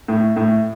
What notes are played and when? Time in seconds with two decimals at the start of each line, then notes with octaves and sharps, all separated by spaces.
0.08 A2
0.36 A2